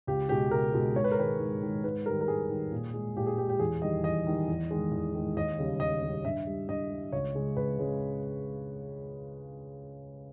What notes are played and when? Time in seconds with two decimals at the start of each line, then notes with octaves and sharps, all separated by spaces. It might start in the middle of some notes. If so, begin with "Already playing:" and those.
0.07 C#2 G4
0.29 B2 G#3 G4
0.51 C#2 A#4
0.73 B2 G#3
0.96 G#2 C#5
1.04 B4
1.11 A#4
1.18 D#3 G#3 B4
1.39 G#2
1.62 D#3 G#3
1.84 G#2 B4
2.06 D#3 G3 A#4
2.21 A#4
2.28 G#2 G#4
2.50 D#3 G3
2.72 A#2
2.94 G#3
3.16 A#2 G4
3.27 G#4
3.38 G#3 G4
3.49 G4
3.59 E2 G#4
3.82 D#3 G3 D#5
4.04 E2 D#5
4.27 D#3 G3
4.48 E2
4.71 D#3 G#3
4.92 E2
5.15 D#3 G#3
5.36 D#2 D#5
5.59 C#3 G3
5.80 D#2 D#5
6.02 C#3 G3
6.25 G2 E5
6.47 G3
6.68 G2 D#5
6.91 G3
7.12 C#2 C#5
7.35 C#3 G#3
7.57 C#2 B4
7.78 C#3 G#3